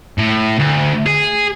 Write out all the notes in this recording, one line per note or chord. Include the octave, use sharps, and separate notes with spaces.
A2
D2
G#4